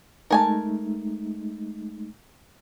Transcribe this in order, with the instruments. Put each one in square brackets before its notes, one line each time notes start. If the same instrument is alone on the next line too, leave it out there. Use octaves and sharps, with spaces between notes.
[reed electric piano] G#3 A3 D#4 [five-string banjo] A#4 G#5 A5